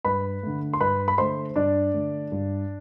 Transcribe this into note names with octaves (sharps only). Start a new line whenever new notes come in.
G2 B4 B5
D3 A3
C6
G2 B4 B5
B5
D3 A3 C5 C6
G2 D4 D5
D3 A3
G2